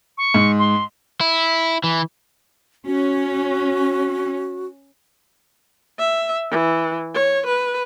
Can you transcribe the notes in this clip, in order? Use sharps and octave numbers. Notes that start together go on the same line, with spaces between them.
C#6
G#2
C6
E4
E3
C#4 F#4
E5
E3
C#5
B4